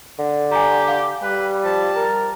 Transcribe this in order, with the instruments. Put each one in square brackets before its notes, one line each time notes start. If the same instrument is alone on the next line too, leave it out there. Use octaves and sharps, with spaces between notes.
[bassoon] D3
[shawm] G4 [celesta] G#5 A#5
[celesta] F5
[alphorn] G3 [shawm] B4
[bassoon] F3 [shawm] A5
[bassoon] A#4